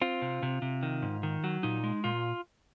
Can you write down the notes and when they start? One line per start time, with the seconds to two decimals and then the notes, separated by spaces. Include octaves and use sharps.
0.02 C4 F4
0.22 C3
0.43 C3
0.62 C3
0.83 D#3
1.02 G#2
1.23 D#3
1.44 F#3
1.63 A#2 D#4
1.84 G#3
2.04 A#2 F4